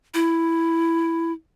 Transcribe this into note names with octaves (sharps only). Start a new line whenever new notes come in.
E4